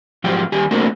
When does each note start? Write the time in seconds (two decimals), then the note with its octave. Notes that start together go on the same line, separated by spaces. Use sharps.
0.24 G#2 F3 F#3 F4 G4
0.52 D#2 G3 G4 G#5
0.71 A3 A#3 C4 D4 F#4 A#4